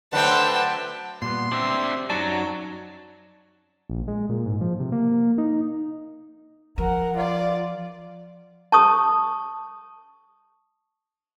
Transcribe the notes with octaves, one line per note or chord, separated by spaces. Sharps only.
D3 F#3 A3 B4 C5 F#5 G5 A5
A#2 G3 B3 C6
C4 D4 G4 E5
F#2 F#3 D#4 D5 A5
A#1
G#3
A#2
G#2
F3
C3
A#3
D#4
F3 A#4 F#5
F4 D5
A5 C#6 D#6